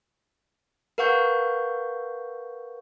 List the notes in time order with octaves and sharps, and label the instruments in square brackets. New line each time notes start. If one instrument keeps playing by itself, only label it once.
[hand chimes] A#4 B4 F5 F#5 C#6 G6